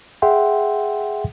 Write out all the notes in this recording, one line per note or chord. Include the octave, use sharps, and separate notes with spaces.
G#4 E5 F#5 G5 C6